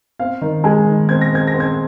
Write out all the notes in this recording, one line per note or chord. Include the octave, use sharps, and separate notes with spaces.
C4 F5
D#3
G#3 G#5
D#3
C4 G#6
A#6
C4 G#6
A#6
C4
G#6